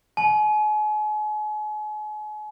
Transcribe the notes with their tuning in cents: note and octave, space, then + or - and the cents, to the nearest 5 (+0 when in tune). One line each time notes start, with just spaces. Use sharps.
G#5 +40